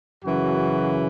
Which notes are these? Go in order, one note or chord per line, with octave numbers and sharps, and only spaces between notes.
F#2 C#3 E3 F#4